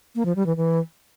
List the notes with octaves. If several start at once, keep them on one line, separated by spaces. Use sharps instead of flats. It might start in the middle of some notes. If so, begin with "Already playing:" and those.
A#3
F3
G3
E3
E3